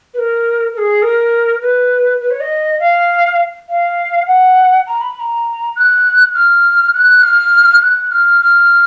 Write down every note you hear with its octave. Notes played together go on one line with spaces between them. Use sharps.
B4
A#4
A#4
G#4
A#4
B4
B4
C#5
D#5
F5
F5
F#5
A#5
B5
B5
A#5
F#6
F6
F#6
F6
F#6
F6
F6